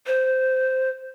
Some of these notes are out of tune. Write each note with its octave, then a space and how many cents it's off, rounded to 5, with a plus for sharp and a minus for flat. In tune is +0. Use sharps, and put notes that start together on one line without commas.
C5 -10